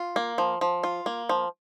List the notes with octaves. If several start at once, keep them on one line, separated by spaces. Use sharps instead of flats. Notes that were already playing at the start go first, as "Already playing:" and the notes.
Already playing: F4
A#3
F3
F3
F4
A#3
F3